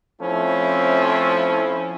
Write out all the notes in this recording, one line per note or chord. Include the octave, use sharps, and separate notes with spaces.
F3 A3 C4 C#4 E4